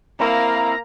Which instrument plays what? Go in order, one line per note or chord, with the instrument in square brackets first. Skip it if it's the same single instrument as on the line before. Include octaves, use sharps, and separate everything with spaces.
[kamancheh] A#3 F5 [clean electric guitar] C4 E4 [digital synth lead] A#5